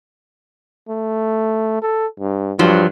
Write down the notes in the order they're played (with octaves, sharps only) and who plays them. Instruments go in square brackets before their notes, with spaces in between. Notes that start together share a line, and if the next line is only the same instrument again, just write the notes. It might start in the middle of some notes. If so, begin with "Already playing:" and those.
[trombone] A3
A4
G2
[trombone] G2 [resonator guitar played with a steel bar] F3 F#3